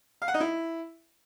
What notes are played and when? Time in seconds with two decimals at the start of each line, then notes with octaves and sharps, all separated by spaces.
0.22 F5
0.28 F#5
0.34 D#4
0.40 E4